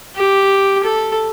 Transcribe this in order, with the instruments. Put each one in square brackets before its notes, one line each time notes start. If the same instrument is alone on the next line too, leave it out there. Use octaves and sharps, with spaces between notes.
[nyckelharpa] G4
A4